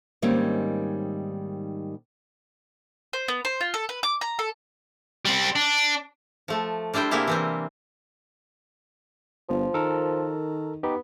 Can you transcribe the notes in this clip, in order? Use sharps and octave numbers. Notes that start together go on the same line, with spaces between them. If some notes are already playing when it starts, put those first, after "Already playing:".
G#2 D#3 G3 A#3 C4 C#4
C5
B3
C5
F4
A4
B4
D6
A#5
A4
G3 C4
D4
F3 A3
G3 D4 E4 C5 G5
C3 A#3 C4 E4 G4 G#4
E3 G3 C4
G1 F3
D#3 A4 A#4
B3 D#4 G4